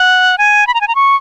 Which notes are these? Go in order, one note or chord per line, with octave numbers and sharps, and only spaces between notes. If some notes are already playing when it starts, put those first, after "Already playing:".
Already playing: F#5
G#5
B5
A#5
G#5
A#5
C#6